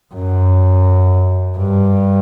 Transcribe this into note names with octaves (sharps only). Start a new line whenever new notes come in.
F#2
G2